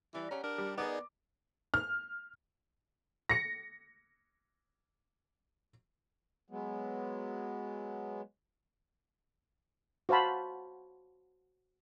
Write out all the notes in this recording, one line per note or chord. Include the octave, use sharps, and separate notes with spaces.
E3 G3 B4
C#4 G4 F#5 A#5
D4 A#4
G3
B3 D#4 G#4 A#4 C5 D5 D6
F6
A#6 C#7
F#3 G#3 B3
F#4 C5 F5 A5 B5